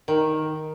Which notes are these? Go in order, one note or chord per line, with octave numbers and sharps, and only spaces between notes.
D#3 A#4